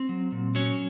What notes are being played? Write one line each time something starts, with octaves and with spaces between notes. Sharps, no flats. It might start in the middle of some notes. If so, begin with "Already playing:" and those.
Already playing: C4
F#3
A#2
F#3 C#4